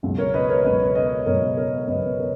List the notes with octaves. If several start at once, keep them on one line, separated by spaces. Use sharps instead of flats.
C#2 B2 F#3
A#4 C#5
B4 D#5
A#4 C#5
C#2 B2 F#3 B4 D#5
C#5
B4 D#5
C#2 B2 F#3 A#4 C#5
A#4 C#5
C#2 B2 F#3 B4 D#5
A#4 C#5